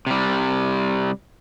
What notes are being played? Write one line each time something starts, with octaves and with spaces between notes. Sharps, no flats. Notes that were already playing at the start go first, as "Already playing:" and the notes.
C3 G3